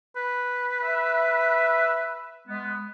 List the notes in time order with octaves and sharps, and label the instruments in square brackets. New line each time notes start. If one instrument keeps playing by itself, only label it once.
[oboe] B4
[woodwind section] E5
G#3 B3